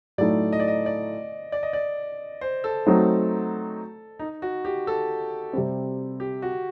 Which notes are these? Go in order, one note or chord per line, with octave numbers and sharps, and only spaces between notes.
A2 F#3 A3 D#4 D5
D#5
D5
D#5
D5
D5
D#5
D5
C5
A4
F#3 A3 C4 D#4
D#4
F#4
G4
A4
C3 G3 C4
G4
F#4